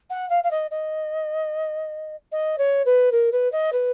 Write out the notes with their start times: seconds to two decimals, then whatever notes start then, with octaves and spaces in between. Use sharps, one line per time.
0.10 F#5
0.30 F5
0.44 F5
0.51 D#5
0.71 D#5
2.32 D#5
2.58 C#5
2.85 B4
3.12 A#4
3.32 B4
3.52 D#5
3.72 B4